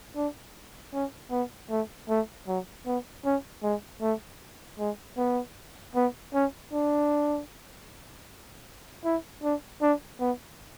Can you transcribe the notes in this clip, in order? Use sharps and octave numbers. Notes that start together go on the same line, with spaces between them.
D4
C#4
B3
A3
A3
F#3
B3
C#4
G#3
A3
G#3
B3
B3
C#4
D4
E4
D4
D4
B3